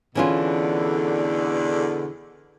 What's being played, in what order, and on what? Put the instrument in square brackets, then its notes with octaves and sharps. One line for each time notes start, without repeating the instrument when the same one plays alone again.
[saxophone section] E2 B2 D3 [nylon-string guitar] E3 C#4 F4